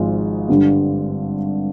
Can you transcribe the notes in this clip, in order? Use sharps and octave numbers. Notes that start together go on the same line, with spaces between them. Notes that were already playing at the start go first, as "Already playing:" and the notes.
Already playing: G#1 G#2 F3 G#3
G2 D3 G3